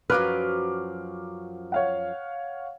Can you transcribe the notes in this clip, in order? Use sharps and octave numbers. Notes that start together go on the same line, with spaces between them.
F#2 F3 F#3 B4 D6 F6
C#5 F5 F#5